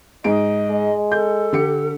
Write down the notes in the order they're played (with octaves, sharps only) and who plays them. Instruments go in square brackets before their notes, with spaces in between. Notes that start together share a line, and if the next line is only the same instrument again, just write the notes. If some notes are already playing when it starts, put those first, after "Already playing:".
[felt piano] G#2 G#4 D7 [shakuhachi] D#5
[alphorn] G#3
[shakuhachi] A4 [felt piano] G6
[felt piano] D3 G4 C#7